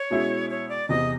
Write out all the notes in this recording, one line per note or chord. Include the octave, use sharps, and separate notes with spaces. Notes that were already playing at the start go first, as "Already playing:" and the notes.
Already playing: C#5
B2 G#3 C#4 E4
C#5
D5
E2 C3 E3 D#5